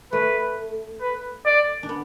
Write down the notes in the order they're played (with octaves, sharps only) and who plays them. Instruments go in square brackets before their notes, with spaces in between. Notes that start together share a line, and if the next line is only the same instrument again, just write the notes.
[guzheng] A3 [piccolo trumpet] B4
[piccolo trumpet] B4
D5
[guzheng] D4
B3